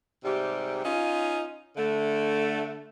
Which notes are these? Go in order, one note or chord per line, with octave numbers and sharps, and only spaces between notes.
G#2 C3 G3 G4
C#4 D#4 F4
D3 A3